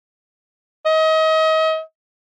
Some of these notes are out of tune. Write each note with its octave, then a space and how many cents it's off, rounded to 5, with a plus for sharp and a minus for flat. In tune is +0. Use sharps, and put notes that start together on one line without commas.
D#5 +35